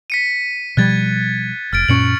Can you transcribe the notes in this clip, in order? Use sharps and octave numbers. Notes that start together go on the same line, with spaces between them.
B6 C#7 D#7
B2 F3 G3 F#6 G#6 A6
F1 F6 A6 D7
F#2 A#2 C#4 C#6 C#7 F#7